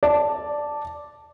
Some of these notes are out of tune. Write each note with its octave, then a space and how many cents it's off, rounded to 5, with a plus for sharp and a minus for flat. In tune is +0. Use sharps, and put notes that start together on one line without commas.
D5 +0 A5 +0